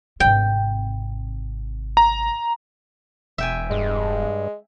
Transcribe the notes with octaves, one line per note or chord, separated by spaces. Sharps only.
G#1 C3 G5
A#5
E1 E5 G5 G#5
G2 G#3